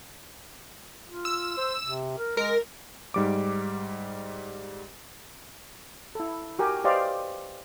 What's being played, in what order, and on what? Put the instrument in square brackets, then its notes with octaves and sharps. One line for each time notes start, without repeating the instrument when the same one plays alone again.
[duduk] F4
[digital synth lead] E6
[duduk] C5
C3
A#4
[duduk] G#3 [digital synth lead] A#4
[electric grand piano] G#2 G3 D6
[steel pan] E4 A4
F#4 G4 A#4 G#5
G4 B4 C5 D5 D#5 F5